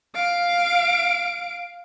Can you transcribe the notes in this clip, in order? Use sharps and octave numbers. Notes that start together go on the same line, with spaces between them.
F5 D7